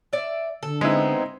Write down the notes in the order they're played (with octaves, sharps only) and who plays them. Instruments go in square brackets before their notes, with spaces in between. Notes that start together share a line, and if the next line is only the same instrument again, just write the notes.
[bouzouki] D5 E5
[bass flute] D3 [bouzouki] A4
[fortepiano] G#3 E4 [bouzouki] B3 [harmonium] C4 D#4